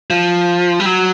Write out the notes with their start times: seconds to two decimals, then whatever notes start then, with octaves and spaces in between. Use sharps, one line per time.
0.10 F3
0.80 G3
0.85 F#3